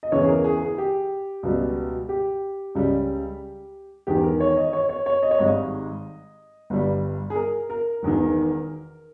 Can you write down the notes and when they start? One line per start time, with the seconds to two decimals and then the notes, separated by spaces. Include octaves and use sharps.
0.03 D#5
0.12 E2 C#3 E3 C#5
0.23 G#4
0.29 A#4
0.44 G#4
0.62 G#4
0.78 G4
1.43 C#2 B2 G3
2.09 G4
2.75 C#2 C#3 G3
4.07 E1 E2 D#3 G4
4.23 A#4
4.40 C#5
4.57 D#5
4.73 C#5
4.89 C#5
5.06 C#5
5.23 D#5
5.31 C#5
5.39 G#1 G#2 G3 D#5
6.70 G1 G2 G3
7.30 G#4
7.36 A#4
7.70 A#4
8.02 E1 E2 D#3